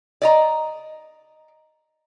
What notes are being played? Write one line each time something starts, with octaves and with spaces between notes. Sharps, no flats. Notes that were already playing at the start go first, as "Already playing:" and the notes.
D5 D#5 A#5